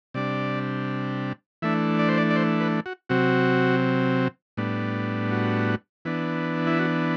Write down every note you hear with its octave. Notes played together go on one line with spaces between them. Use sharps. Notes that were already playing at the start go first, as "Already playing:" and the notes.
C3 G3 D4 D5
E3 A3 D4 E5
D5
C5
D5
D5
C5
B4
F#4
C3 F#3 C4 F#4
A2 G3 B3 D4
F#4
E3 B3 D4
E4
F#4